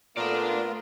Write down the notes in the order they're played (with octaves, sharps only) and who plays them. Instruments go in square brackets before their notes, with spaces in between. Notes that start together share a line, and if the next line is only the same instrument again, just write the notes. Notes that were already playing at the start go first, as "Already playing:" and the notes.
[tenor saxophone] A#2 [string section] A3 F4 [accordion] B3 A#4 [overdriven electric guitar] D5 A5